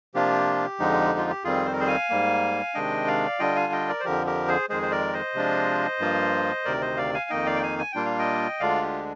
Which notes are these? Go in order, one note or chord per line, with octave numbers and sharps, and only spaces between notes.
C3 F3 A#3 D4 F4 G4
F2 D3 F3 G#3 D#4
F4
G4
F2 D#3 G3 C4 F4 G#4
C5
A#4
G#4 C5
F5 G#5
G#2 G3 A#3
C3 D#3 G#3 D4 D#5 G5
D5 F5
D3 G3 D4 F4 D#5 G5
F5 G#5
D#5 G5
A#4 D5
C5
F2 D3 F3 G4 A#4
G4 A#4
G#4 C5
F2 D#3 G#3 G#4 C5
C5
A#4 D5
C5 D#5
C3 F3 G#3 D4 F4
G2 F3 A#3 F4
D2 C3 D#3 A#4 D5
C5 D#5
D5 F5
F5 G#5
F2 D#3 A#3 D#4 D#5 G5
D5 F5
G5
F5 G#5
G#5
A#2 G3 A#3 D4 F4 G5
F5
D#5 G5
D2 D3 G#3 D4 F4 D5 F5
G4